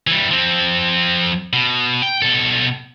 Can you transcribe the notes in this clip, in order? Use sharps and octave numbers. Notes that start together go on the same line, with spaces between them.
E3 G3
F3 C4
B2
G5
B2 A4